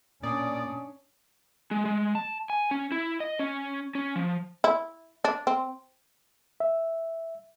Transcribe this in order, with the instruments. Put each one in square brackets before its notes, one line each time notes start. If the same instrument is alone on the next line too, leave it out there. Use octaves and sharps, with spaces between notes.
[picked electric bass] A#2 [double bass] C#4 D4 [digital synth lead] D5 [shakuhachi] D#6
[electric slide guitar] G#3
G#3
A5
G#5
C#4
E4
D#5
C#4
C#4
F3
[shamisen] E4
D4
C4
[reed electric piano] E5